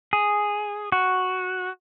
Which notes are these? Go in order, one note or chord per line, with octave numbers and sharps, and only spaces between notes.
G#4
F#4